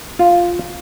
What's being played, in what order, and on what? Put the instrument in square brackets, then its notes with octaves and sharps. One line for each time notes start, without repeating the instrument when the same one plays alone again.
[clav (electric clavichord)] F4